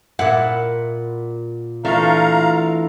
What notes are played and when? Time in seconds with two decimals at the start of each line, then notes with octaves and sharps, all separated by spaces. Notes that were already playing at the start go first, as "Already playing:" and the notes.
0.19 A#2 E4 F#5
1.85 E3 A3 D4 F4 F5 A#5